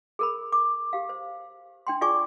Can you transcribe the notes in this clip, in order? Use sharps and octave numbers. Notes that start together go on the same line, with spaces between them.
G#4 A#4 B5
D6
G4 F5
C5
D4 G5 C6
F4 G#4 D5 G#5 C#6 D6